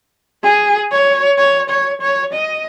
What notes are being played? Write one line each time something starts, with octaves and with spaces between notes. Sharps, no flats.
G#4
C#5
C#5
C#5
C#5
D#5